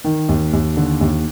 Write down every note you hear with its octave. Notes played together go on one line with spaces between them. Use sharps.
D#3
D#2
D#2
D3
D#2